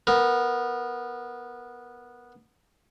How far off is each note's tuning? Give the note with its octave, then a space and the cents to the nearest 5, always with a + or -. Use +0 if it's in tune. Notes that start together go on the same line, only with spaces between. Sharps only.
B3 -10 A#4 +0